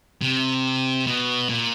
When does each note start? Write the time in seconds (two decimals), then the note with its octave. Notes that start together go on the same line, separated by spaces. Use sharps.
0.22 C3
1.07 B2
1.49 A#2